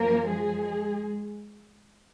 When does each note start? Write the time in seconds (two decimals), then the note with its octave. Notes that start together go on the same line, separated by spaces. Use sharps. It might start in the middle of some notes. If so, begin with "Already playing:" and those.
Already playing: F#2 F3 A#3 A#4
0.29 G#3 G#4